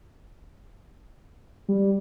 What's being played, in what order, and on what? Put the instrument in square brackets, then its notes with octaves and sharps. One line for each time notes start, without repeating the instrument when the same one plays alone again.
[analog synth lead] G3